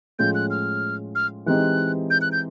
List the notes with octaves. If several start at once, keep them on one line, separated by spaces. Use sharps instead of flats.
A2 F3 G#3 C#4 F4 G6
F#6
F6
F6
E3 G#3 C4 D#4 G4 F#6
G6
F#6
G6